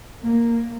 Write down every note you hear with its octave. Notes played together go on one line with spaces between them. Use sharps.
A#3